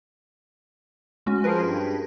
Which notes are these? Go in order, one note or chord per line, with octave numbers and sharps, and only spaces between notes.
G#3 C#4 F#4
F3 G#4 A#4 B4
G2